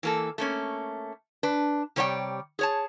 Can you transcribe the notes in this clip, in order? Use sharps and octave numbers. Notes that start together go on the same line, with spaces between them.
E3 A#3 A4
A3 A#3 C#4
D4 B4
C3 G3 C#5 D5 G5
G#4 C#5 A5